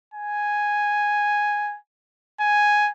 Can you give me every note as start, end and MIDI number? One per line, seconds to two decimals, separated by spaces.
0.14 1.77 80
2.41 2.91 80